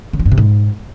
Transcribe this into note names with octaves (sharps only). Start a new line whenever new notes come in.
C#3
F#3
G2
C3
G#2